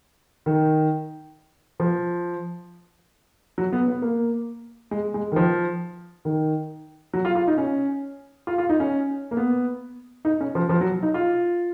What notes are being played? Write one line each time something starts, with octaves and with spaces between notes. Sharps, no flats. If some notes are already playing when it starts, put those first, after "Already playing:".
D#3
F3
F#3
B3
B3
A#3
G#3
G#3
D#3
F3
D#3
F#3
F4
F4
D#4
C#4
F4
F4
D#4
C#4
A#3
B3
D#4
C#4
F3
F3
F#3
D#4
F4